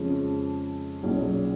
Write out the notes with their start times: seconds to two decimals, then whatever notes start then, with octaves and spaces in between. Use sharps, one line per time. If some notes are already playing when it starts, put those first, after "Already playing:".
Already playing: F2 C#3 F3 G#3 C#4
1.03 B1 A#2 F#3 C#4 G#4